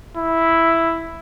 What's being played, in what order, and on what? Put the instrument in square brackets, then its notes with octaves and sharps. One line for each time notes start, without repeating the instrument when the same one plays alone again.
[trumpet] E4